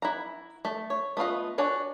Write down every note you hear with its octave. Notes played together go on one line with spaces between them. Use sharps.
E4 F#5 A#5
A3
C#5
A3 B3 F4 D#5
D4 F#4 C#5 G#5